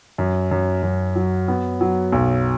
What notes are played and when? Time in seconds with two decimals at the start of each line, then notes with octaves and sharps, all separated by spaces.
0.18 F#2
0.51 F#2
0.83 F#2
1.16 F#3
1.48 B3
1.81 F#3
2.12 B1